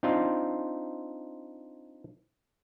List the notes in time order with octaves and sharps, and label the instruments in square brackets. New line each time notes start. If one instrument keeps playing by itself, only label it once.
[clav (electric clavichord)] C4 D4 D#4 F4